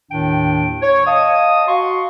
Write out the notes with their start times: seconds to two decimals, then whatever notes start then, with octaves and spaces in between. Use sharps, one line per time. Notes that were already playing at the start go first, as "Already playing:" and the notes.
0.11 D#2 A2 D#3 D4 G5
0.82 C#5
1.07 D#5 F5 A5 D#6
1.67 F#4 F5 C6 C#6